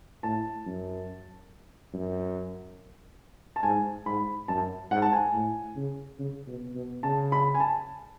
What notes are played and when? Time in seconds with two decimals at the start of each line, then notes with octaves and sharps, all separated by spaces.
0.23 A2 A5
0.66 F#2
1.93 F#2
3.56 A5
3.63 G#2 G#5
4.06 G#2 B5
4.48 F#2 A5
4.91 G#2 F#5
5.02 A5
5.12 G#5
5.33 A2
5.76 C#3
6.18 C#3
6.47 B2
6.75 B2
7.03 C#3 A5
7.32 B5
7.55 G#5
7.60 A5